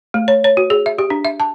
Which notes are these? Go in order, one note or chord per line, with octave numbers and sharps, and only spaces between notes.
A3
C#5
C#5
F#4
G#4
E5
G4
D4
E5
A5